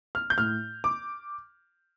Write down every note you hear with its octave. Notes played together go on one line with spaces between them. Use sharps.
F6
G6
A2 F6
D6